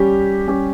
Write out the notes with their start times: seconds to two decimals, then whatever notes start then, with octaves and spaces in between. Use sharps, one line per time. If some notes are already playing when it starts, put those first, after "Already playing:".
Already playing: G3 C#4 G4
0.48 G3 C#4 G4